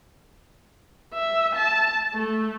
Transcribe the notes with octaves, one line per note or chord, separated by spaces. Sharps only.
E5
A5
A3